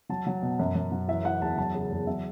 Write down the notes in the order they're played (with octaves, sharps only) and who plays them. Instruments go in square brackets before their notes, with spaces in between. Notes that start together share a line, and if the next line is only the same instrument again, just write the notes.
[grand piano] F#3 A5
F#3
B2
F#2
F#2
F#3
E3 E5
E3 F#5
E2 A5
F#3 A5
C#3
E2
F#3 E5